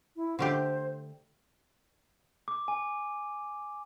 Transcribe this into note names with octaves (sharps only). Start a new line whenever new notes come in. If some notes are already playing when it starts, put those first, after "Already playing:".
E4
D3 A3 G4 C5
D6
G#5